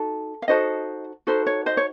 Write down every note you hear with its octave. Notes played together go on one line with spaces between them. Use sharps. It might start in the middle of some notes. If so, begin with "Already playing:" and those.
Already playing: D#4 F#4 A4
F5
D#4 F#4 A4 C5 D#5
D#4 F#4 A4 C5
C#5
C5 D#5
C#5